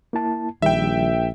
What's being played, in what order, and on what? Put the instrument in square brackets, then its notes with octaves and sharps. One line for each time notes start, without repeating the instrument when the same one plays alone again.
[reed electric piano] A#3 E4 A5
[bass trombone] A#1 [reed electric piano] D#3 G3 [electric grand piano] E5 G5